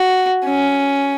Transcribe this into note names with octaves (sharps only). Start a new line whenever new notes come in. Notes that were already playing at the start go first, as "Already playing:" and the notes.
Already playing: F#4
C#4